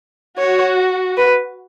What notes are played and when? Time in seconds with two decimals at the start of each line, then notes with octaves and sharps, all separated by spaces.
0.38 F#4 C#5
1.17 B4